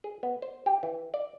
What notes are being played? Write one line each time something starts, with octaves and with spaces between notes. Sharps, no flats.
G#4
B3
C5
G4
E3
D5